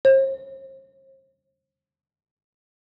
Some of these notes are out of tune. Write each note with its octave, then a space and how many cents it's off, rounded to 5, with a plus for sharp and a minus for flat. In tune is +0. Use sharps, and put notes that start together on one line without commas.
C5 +40